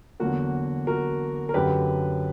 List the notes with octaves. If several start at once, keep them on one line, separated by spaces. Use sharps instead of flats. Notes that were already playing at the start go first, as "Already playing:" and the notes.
E2 D3 F#3 A#3 F#4 A#4
F#4 A#4
A#4
F#2 D3 F#3 G4 B4